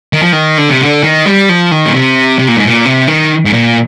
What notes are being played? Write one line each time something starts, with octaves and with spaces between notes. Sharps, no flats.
D#3
F3
D#3
D3
C3
D3
D#3
G3
F3
D#3
A#2
C3
C3
A#2
G#2
A#2
C3
D#3
G#2
A#2